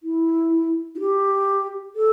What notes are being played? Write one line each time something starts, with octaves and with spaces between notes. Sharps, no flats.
E4
E4
G4
A4